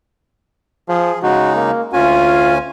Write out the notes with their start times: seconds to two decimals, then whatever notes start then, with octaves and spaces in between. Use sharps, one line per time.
0.89 F3 G#4
1.23 C#3 G#3 D#4 F#4
1.55 A#3
1.93 D2 C#4 F4 G#5